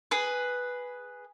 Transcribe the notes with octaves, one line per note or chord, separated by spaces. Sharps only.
G#4 B4